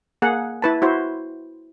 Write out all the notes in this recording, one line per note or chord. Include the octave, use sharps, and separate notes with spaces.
A#3 G#4 F#5
E4 B4 A5
E4 F#4 C5